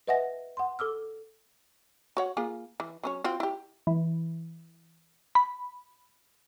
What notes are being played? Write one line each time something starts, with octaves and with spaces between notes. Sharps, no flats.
B4 D#5 E5 F#5 G#5 A#6
F#5 C6
A4 D6 E6 F6
F#4 C#5 F#5
A#3 F4 G#4
E3
F#3 C#4 C#5
C4 F4 F#4
E4 G4
E3
B5